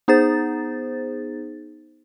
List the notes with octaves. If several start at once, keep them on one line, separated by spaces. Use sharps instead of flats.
B3 D#4 G#4 C5 A6